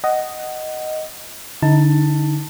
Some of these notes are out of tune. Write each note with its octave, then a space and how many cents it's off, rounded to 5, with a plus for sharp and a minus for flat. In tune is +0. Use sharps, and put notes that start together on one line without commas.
D#5 +0 F#5 +15
D3 +0 D#4 +35 A5 +15